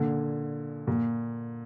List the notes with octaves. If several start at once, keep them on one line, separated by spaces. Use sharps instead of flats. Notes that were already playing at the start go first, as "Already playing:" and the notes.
Already playing: A#2 D3
A#2